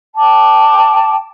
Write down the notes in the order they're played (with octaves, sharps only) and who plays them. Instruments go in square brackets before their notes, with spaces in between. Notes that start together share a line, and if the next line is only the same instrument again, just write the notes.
[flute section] G5 A5 D6